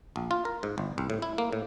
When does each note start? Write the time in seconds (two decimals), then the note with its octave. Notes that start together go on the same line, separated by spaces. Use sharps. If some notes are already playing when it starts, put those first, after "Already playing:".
0.16 A#1
0.31 F4
0.45 A#4
0.63 G#2
0.78 G1
0.98 C2
1.10 A2
1.22 E4
1.38 A#3
1.53 A2